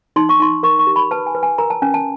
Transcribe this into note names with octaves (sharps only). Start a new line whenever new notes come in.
D#4 C6
C#6
D#4 C6
A#4 C#6
C#6
G4
B5
B4 A5
G#5
B4
G#5
A#4 A#5
A5
C#4 G#5
A5